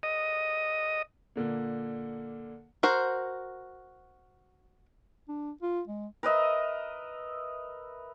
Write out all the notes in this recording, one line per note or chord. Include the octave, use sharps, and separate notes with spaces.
D#5
A#2 D3 A#3
F#4 A#4 C5
D4
F4
G#3
A#4 B4 D#5 E5